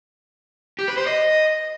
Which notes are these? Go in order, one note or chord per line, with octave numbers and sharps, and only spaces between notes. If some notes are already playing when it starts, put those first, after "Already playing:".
G4
B4
C5
D#5